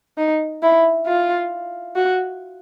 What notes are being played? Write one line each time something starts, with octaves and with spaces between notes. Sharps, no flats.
D#4
E4
F4
F#4